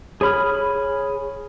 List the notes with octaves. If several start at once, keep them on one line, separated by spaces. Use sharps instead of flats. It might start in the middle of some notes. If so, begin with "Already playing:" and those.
G#4 C#5 B5 F6